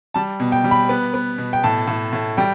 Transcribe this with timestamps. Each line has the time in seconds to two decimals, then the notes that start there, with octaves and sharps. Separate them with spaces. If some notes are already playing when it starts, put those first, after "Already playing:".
0.14 G3 A5
0.40 B2
0.52 G5
0.64 G3
0.71 B5
0.89 B3
1.14 B3
1.38 B2
1.53 G5
1.63 A2 A5
1.88 A2
2.13 A2
2.38 G3 G5